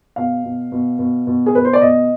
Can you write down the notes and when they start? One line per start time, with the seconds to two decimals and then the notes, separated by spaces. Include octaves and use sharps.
0.16 B2 F5
0.44 B2
0.72 B2
0.99 B2
1.27 B2
1.46 G#4
1.55 B2 B4
1.65 C5
1.73 D5
1.82 B2 D#5